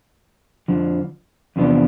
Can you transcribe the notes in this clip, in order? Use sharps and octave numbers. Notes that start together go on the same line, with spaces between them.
F2 D3 F3
E2 C3 F3 B3 D4